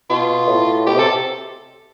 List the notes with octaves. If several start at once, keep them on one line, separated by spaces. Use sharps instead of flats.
B2 F4
A2
B2 G4
C3 A4